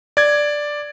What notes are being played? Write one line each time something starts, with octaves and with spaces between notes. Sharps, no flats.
D5 G#6